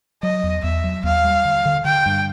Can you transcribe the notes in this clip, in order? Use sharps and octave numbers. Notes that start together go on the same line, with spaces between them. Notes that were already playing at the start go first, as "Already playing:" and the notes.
F#3 D#5
E2
E2 E5
F#3
D#2 F5
G3
D3
D3
D3 G5
G2